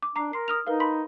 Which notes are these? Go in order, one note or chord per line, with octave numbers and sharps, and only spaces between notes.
D6
D4 A#5 D6 C7
A#4 C6 C7
D#6 F6 F7
D#4 A#4 B4 F5
B5 C6 B6